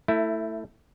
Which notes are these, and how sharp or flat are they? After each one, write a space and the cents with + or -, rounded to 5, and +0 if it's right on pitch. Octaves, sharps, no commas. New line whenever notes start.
A3 +20 E4 +0